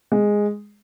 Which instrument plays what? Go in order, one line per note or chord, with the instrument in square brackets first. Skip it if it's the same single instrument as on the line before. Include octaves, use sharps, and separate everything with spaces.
[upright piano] G#3